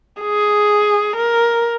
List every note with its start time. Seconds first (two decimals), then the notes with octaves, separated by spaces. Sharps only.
0.22 G#4
1.16 A#4